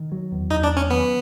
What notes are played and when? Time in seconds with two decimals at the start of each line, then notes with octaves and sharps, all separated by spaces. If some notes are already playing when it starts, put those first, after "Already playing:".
Already playing: D#3
0.12 F#3
0.32 E2
0.51 E2 D#4
0.63 D4
0.71 F#3
0.76 C#4
0.90 D#3 B3